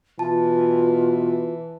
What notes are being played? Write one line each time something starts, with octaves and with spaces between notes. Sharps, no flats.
B2 E3 F4 A5